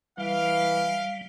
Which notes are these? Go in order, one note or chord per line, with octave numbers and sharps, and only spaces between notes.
E3 G3 F5